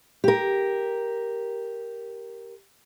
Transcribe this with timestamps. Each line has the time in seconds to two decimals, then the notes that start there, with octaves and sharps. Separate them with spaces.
0.24 G4 A#4